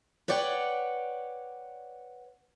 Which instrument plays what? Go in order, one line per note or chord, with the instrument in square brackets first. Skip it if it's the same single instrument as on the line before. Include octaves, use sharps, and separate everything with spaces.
[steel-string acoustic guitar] B4 C#5 D5 F#5 G5